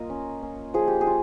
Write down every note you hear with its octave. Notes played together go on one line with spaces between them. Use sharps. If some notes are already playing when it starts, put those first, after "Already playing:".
Already playing: A#3 F4 A#4 D#5
C#4
C#4
F3 G#4
G4
G#4
F4